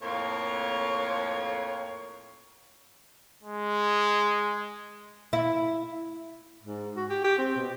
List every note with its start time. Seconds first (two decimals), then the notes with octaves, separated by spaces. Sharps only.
0.02 F2 A2 A#3 C#5
3.43 G#3
5.33 E4
6.63 G#2
6.96 F#4
7.10 G4
7.24 G4
7.38 C4
7.56 B2